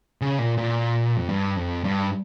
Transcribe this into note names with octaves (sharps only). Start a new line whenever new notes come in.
C#3
A#2
A#2
F2
G2
F2
G2